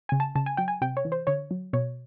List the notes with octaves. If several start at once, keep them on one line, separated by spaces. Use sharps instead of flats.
C#3 G#5
A5
C#3 A5
G#5
F#3 G5
G#5
C3 G5
C#5
E3
C5
D3 C#5
F#3
B2 C#5